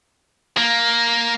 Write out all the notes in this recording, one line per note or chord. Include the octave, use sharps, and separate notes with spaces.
A#3